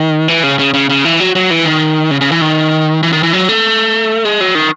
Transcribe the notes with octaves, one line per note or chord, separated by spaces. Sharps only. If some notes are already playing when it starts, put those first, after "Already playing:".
Already playing: D#3
E3
C#3
C#3
C#3
C#3
E3
F#3
F#3
E3
D#3
C#3
C#3
E3
D#3
E3
D#3
E3
F#3
A3
G#3
F#3
D#3